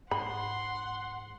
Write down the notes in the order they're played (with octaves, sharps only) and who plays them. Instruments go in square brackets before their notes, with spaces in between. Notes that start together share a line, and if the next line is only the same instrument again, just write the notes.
[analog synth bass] G#2 [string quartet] F#5 [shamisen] B5 [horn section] C6